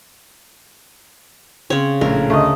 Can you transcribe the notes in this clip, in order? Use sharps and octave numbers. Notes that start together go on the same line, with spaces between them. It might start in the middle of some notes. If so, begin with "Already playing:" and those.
C#3 C4 C#5
A#1 A2 A#4
D2 A3 D#5